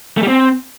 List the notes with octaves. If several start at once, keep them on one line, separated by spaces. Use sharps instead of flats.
A3
G3
C4